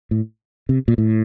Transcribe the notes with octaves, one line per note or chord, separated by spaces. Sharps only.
A2
C3
A#2
A2